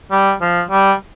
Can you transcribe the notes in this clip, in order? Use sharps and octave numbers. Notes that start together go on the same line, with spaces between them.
G3
F3
G3